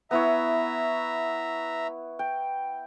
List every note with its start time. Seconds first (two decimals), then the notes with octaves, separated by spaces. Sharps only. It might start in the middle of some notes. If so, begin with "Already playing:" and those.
0.11 B3 E4 C#5 E5 A#5
2.19 G5